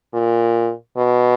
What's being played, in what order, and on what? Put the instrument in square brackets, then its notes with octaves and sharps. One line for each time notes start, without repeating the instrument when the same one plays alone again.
[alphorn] A#2
B2